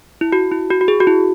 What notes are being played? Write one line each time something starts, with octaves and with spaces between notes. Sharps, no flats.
E4
F#4
E4
F#4
F#4
G#4
F#4
E4